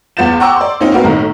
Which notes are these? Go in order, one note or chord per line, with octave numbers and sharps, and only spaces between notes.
E2 B3 F4 G6 A6 E7
F#5 G5 A#5 C#6 D6 E6
D5 C6
A#3 C4 C#4 D#4 F4
A#3 C4 F#4 A#4 B4 F5
B1 A2 D#3 A#5